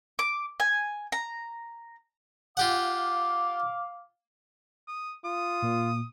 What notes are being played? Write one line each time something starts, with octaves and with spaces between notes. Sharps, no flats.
D6
G#5
A#5
F4 G4 F5 F#5 D6
D#6
F4 D#6
A#2